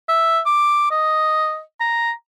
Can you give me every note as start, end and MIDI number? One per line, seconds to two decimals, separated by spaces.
0.09 0.40 76
0.46 0.88 86
0.91 1.60 75
1.80 2.11 82